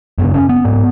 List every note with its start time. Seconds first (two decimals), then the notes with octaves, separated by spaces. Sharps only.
0.18 F#2 C#3 B3
0.34 C#4
0.49 B3
0.65 G#2